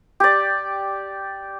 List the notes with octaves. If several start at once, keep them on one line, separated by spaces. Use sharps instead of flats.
G4 D5